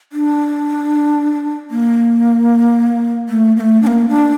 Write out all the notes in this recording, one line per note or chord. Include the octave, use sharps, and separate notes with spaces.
D4
A#3
A3
A#3
A3
D4
A#3
D4